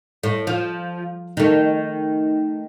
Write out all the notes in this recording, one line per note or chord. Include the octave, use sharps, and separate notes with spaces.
A2
F3
D#3 A3